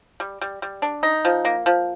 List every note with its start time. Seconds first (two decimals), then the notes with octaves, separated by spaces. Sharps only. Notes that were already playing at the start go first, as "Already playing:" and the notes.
0.20 G3
0.41 G3
0.62 G3
0.82 D4
1.03 D#4
1.25 F3
1.45 A#3
1.66 F3